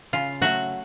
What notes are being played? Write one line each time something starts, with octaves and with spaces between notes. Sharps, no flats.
C#3 F4
F#3 A3 F#4